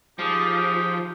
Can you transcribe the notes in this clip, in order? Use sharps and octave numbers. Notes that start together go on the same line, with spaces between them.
F3 D#4 G4 G#4